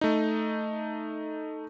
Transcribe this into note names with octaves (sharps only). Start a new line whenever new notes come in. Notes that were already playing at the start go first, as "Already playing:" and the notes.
A3 D#4